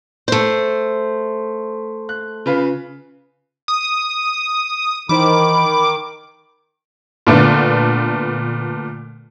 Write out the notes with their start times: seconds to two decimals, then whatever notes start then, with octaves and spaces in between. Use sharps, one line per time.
0.28 A3 C5
2.09 F#6
2.46 C#3 F4 B4
3.68 D#6
5.09 D#3 E3 D#4 C5 B5 D6
7.27 A#2 D3 A3 B3